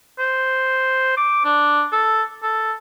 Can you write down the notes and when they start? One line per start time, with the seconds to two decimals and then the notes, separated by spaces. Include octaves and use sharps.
0.19 C5
1.17 D6
1.45 D4
1.92 A4
2.43 A4